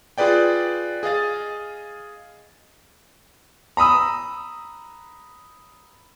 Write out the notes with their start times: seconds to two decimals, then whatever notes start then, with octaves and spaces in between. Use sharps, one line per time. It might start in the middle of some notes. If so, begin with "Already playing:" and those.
0.18 F4 G#4 B4 D5 G5
1.03 G#4 D#5 F5 A6
3.77 A#5 B5 D#6 E6